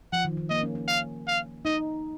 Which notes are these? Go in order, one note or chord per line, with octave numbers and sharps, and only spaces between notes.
F3 F#5
D#3
D#3
A#3 D#5
C#4
C#4
F5
F5
D#4 D#5